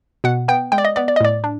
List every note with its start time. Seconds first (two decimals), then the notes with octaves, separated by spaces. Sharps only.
0.24 B2 F#5
0.48 B3 G5
0.72 G#3 G5
0.78 D5
0.85 D#5
0.96 B3 D5
1.08 D5
1.16 D#5
1.21 A2 D5
1.44 D4